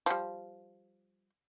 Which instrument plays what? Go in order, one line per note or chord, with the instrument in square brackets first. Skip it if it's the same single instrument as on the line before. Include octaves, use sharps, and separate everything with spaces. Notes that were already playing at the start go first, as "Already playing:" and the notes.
[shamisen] F3 G3